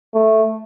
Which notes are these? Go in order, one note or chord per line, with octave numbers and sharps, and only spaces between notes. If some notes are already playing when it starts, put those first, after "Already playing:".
A3